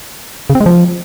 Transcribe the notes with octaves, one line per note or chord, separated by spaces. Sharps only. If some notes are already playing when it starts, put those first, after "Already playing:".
C#3
C4
G#3
F3